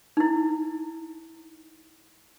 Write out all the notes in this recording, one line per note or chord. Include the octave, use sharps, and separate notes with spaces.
D#4 E4